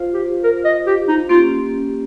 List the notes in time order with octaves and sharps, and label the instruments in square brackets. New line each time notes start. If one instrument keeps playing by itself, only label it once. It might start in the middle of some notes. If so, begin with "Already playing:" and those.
Already playing: [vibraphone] F4 C5 F5
[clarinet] G4
A#4
D#5
G4
D#4
[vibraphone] A#3 C#4 G4 [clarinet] F4